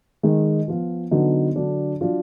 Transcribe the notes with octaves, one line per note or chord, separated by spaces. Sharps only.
D#3 G#3 D#4
F3 B3 F4
D3 F#3 B3 D#4
D3 F#3 D4
F#3 D4 F4